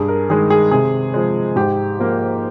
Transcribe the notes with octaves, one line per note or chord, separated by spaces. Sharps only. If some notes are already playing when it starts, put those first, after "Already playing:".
Already playing: G2 G#4
A#4
D#3 G#3 G#4
G#4
C3 G#4
F3 G#3
G#2 G4
F3 A#3